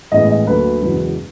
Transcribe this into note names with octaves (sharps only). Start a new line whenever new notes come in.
A1 A2 E3 G#3 B3 D#5
D#5
D2 D3 F#3 A#3 B4
F#1 E2 B2 G#3